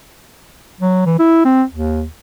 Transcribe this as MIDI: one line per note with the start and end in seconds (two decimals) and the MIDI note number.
0.81 1.02 54
1.06 1.16 52
1.19 1.43 64
1.45 1.63 60
1.71 2.06 39